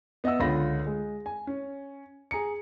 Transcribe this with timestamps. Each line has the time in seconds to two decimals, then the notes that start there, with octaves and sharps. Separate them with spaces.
0.24 B3 D#5 E5 F#5 E6
0.40 C#2 D3 F4 C#5 B5 A#6
0.86 G#3
1.26 G#5
1.47 C#4
2.31 G#4 A#5 C#7